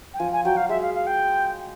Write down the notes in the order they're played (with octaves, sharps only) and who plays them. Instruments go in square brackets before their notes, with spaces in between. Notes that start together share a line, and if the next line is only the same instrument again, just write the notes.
[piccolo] G5
[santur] F3 [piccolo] G#5
[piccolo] G#5
[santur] F#3 [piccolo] G5
[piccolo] F5
[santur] G#3 [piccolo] E5
[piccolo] F5
F5
G5